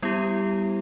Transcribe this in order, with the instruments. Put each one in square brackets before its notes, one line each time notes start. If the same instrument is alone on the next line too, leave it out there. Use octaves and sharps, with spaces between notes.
[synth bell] G3 B3 E4 G4